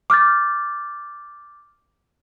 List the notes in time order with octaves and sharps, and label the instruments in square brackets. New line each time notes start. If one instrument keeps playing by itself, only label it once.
[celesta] D6 F6 G6 A6